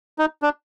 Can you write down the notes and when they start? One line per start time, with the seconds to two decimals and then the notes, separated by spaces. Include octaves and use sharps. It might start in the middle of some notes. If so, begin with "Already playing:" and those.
0.18 D#4
0.42 D4